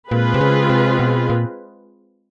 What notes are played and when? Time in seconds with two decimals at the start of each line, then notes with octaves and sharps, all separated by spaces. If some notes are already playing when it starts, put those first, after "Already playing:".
0.11 A#2 G#3 C4 F4 G#4 B4
0.34 C3
0.41 C#3
0.70 C3
0.99 B2
1.30 A#2